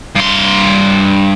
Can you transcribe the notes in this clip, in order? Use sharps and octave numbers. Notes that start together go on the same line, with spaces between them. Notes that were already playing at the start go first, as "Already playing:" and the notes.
G2 C6